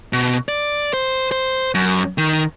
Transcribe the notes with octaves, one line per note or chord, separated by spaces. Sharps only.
B2
D5
C5
C5
F#2
D#3